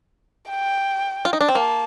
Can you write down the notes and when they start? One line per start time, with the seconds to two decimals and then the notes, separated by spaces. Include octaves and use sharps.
0.50 G5
1.25 F4
1.33 D#4
1.41 D4
1.49 C4
1.55 A#3 A5